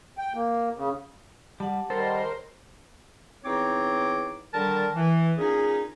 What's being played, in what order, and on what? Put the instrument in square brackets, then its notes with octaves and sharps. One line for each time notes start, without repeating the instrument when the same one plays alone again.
[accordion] G5
A#3
C#3
[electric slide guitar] G3 [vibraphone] F#5 A5
[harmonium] D#3 G3 [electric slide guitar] A4 [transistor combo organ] A#4 C5
[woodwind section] E2 C4 D#4 C#5 D6
D3 D#3 G3 A#4 A5
E3
A#2 C#4 D#4 G#4